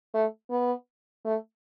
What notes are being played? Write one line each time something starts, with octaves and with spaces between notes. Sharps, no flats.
A3
B3
A3